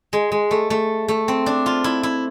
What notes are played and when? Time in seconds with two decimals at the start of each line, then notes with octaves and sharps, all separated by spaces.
0.13 G#3
0.32 G#3
0.51 A3
0.70 A3
1.08 A3
1.28 C4
1.46 D4
1.66 F4
1.84 E4
2.03 E4